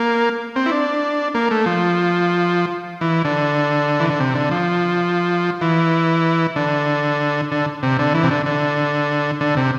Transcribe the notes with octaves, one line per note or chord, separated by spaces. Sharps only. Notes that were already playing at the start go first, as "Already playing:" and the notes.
Already playing: A#3
C4
E4
D4
A#3
A3
F3
E3
D3
E3
D3
C3
D3
F3
E3
D3
D3
C3
D3
E3
C3
D3
D3
D3
C3